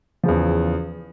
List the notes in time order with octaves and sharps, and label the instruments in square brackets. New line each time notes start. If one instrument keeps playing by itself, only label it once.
[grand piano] E2 C#3 F3